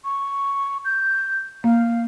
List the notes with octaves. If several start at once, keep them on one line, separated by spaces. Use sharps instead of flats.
C#6
G6
A#3 F5